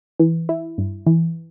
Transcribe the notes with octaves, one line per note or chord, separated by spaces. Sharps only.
E3
E4
G2
E3